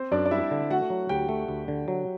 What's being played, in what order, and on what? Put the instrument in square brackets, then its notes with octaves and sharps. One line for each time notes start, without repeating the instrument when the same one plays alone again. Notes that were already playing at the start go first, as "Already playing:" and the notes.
Already playing: [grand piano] C4 C5
[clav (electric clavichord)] F#2 [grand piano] D4 D5
[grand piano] D5
[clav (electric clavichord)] G3 [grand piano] E4 E5
[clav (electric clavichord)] D3
[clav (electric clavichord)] A3 [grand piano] F#4 F#5
[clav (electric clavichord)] F#3
[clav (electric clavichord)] D2 [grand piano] G4 G5
[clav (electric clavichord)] A3
D2
D3
F#3